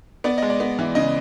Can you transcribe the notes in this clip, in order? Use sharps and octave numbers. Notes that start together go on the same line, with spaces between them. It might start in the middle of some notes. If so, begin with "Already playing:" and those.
B3 D5
G#3 D#5
D5
B3
E3
C#3 D#5